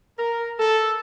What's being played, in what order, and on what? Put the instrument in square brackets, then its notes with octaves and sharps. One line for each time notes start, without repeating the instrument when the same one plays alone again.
[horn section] A#4
A4